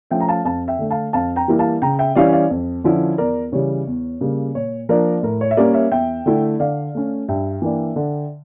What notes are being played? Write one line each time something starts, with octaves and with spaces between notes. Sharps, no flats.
F3 A3 C#4 E5 G5
A#5
F5 A5
F2 F5 A5
E5 G5
D3 A3
F5 A5
F2 F5 A5
G5 A#5
E3 G3 A#3 E4
F5 A5
C#3 G5 A#5
E5 G5
E3 G3 C#4 E4 D5 F5
D5 F5
F2
D3 F3 C#4 E4
E2 A#4 D5
C#3 E3 G3 C#5
E2
C#3 G3 A#3
A#2 C#5
F3 A#3 D4 A#4
A2 A#4
C#5
E5
G3 A#3 C#4 A#4 D5
C#5 E5
E2 E5 G5
D3 A3 E4
D3 D5 F5
A3 C#4
G2 E5 G5
E3 A#3 D4
D3